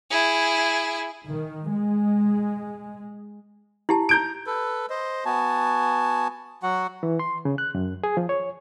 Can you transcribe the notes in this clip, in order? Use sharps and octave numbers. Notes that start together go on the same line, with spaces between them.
E4 G#4
D#3
G#3
E4 G4 A5
A#5 G6 D7
A4 B4
C5 D#5
B3 F#4 G#5 A5
F#3 F#4 F#5
E3
C6
C#3
F#6
F#2
G#4
F3
C#5